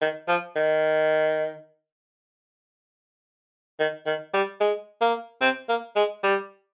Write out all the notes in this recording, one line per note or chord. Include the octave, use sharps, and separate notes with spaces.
D#3
F3
D#3
D#3
D#3
G3
G#3
A#3
C4
A#3
G#3
G3